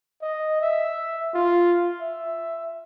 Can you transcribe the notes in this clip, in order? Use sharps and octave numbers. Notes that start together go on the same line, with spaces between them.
D#5
E5
F4
E5